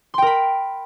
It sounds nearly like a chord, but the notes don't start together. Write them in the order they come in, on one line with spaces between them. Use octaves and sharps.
C6 G5 A#4 B5